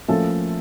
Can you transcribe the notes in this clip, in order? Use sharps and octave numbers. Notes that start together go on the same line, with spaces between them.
F3 A3 A#3 C#4 A4